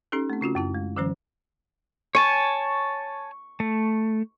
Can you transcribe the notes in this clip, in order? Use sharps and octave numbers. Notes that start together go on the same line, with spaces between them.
C#4 D#4 G4 A4
A3 C4
C#3 C#4 F4 F#4
F#2 E4 A5
G#3
D3 E3 F#3 C#4 C5
C#5 G#5 A5 C#6
A3